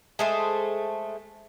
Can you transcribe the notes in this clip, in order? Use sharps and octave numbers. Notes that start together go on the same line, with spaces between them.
G#3 A3 C5